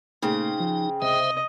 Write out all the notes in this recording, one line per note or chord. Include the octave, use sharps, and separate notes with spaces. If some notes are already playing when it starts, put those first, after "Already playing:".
A#2 C#3 A3 A#3 C4 D#4
F3
C#2 C3 C5 D#5 E5